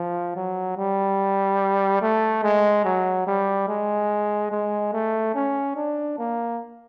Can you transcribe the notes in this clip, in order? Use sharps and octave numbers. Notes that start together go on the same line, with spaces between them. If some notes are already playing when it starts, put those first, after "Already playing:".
Already playing: F3
F#3
G3
A3
G#3
F#3
G3
G#3
G#3
A3
C#4
D4
A#3